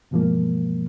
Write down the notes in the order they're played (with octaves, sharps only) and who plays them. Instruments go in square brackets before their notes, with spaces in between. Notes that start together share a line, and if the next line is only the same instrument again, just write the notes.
[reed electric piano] G2 B2 E3 F3 G#3 A#3